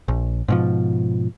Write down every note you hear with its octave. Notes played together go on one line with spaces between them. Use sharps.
A#1
G#2 B2 F3